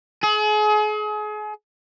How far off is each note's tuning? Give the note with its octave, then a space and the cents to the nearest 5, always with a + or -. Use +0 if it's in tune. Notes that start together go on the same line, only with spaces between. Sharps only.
G#4 +35